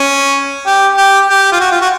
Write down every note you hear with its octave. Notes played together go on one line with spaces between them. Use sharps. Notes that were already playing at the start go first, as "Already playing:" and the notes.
Already playing: C#4
G4
G4
G4
F4
F#4
F4
F#4